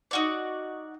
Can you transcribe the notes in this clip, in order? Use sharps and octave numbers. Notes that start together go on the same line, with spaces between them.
D#4 F#4 D5